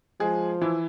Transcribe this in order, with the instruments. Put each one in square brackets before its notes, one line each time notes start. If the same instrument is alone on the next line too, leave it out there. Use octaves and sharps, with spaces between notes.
[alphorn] F3 [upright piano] G#3 G#4
[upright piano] E3 E4